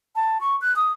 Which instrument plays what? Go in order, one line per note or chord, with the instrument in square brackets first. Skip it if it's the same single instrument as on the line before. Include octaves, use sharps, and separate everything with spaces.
[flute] A5
C#6
F#6
D#6